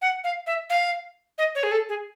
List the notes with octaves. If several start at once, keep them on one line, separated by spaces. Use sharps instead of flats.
F#5
F5
E5
F5
D#5
C#5
G#4
A4
G#4